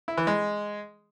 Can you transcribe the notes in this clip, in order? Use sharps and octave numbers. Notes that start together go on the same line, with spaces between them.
E4
E3
G#3